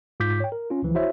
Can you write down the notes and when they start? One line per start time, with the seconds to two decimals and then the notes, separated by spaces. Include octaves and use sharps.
0.20 G#2 F4 D6 G6 B6
0.40 C#5 G5
0.52 A#4
0.71 C#4 F4
0.82 C#2 E3 F3
0.95 E4 F#4 C5 C#5 E5